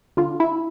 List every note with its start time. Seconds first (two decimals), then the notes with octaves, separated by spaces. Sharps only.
0.17 D3 F4
0.40 E4